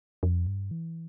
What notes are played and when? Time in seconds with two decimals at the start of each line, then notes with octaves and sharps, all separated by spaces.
0.23 F2
0.47 G2
0.71 E3